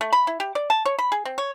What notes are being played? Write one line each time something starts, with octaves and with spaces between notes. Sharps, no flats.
A3
B5
E4
G4
D5
A5
C#5
B5
G#4
C4
C#5